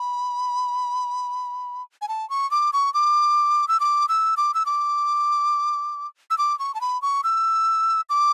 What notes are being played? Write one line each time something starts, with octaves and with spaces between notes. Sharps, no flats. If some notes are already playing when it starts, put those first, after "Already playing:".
Already playing: B5
G#5
A5
C#6
D6
C#6
D6
E6
D6
E6
D6
E6
D6
E6
D6
C#6
A5
B5
C#6
E6
D6